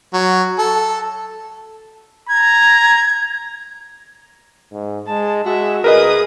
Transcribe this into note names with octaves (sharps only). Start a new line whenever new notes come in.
F#3
A4
A#5 G#6
G#2
G#3 A5
G#3 F#4 E5
D2 G#4 A#4 B4 D#5 D#6